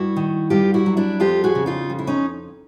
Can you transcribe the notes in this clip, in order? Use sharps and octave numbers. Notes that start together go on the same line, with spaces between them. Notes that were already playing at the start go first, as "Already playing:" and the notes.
Already playing: G2 E4 F#4
D#3
G2 F4 G4
E4 F#4
F#3
D4 E4
F2 F4 G4
F#4 G#4
C#3
D#4 F4
F2
E4
C#4 D#4